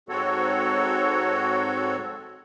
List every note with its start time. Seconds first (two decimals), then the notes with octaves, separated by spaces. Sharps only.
0.09 G#2 C4 F#4 A4 C#5